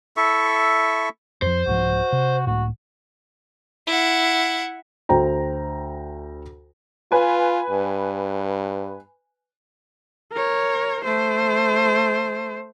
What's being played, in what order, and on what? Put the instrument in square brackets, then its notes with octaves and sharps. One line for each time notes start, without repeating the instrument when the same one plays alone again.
[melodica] E4 A4 E5 C#6
[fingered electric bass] F2 F3 [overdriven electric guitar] C5
[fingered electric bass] C2 G#2 F3 [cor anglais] F#4
[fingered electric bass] C3
[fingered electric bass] C#2 A2 [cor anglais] F#4
[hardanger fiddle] E4 F#5
[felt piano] D2 C5 G5 A#5
[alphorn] F4 [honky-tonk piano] B4 G#5
[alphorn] G2
[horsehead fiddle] A#4 C#5
A3 C5